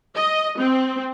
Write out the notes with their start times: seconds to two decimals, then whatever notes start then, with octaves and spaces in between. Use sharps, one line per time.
0.16 D#5
0.59 C4